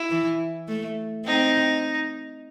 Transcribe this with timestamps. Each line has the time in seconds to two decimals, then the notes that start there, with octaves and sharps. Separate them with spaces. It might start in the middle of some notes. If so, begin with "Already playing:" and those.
Already playing: E4
0.10 E3
0.68 A3
1.26 C4 D#4